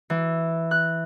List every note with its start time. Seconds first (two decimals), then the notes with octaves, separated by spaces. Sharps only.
0.10 E3
0.71 F#6